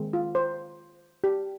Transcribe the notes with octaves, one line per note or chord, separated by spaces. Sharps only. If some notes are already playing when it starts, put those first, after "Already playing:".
Already playing: D#3 G#3 C4
F4
C5
G4